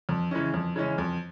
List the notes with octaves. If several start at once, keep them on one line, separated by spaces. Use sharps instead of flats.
F2
C#3 E3 G#3 C#4
F2
C#3 E3 G#3 C#4
F2